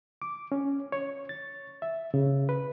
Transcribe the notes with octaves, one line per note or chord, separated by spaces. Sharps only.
D6
C#4
C#5
A6
E5
C#3
B4